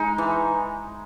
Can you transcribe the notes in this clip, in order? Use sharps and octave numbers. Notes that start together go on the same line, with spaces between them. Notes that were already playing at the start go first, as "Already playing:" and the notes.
Already playing: G#3 D#4
E3